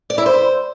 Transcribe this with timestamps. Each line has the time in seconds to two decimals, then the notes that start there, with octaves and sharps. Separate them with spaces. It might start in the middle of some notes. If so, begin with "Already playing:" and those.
0.10 D5
0.18 E4
0.26 C5